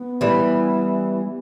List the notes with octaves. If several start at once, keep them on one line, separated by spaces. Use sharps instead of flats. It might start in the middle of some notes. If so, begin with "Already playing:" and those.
Already playing: B3
E3 G3